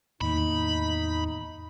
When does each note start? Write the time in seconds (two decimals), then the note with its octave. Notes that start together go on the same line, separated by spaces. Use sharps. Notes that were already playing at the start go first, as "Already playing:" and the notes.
0.21 E2 A2 D#3 A#3 D#4 B5